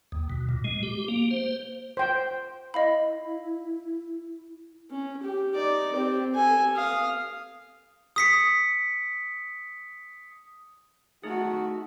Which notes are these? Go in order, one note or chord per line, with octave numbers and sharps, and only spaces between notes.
D#2
B2
A#2
G#3
G4
A#3
C5
C5 G5
E4 D#5 F5 B5
C#4
G4
D#4 D5
C4 G4
A4 G#5
F5 D#6
D#6 B6 C#7
A3 D#4 F#4 G#4